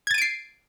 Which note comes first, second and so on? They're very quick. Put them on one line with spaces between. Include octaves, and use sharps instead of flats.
G#6 A6 D#7 D7 C7